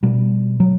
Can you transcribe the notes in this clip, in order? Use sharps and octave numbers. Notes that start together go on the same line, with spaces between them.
B2 G3
F#3